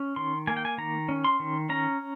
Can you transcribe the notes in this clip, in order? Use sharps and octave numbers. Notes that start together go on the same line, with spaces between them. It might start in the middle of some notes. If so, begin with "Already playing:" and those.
Already playing: C#4
D#3 C6
A#3 G#5
G5
G#5
D#3 A#5
C#4
C6
D#3
C#4 A#5